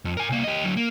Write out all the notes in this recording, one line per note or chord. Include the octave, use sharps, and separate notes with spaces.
F2
A#4 G#5
C2 A#3
G4 D#5
D3 F#3
A#3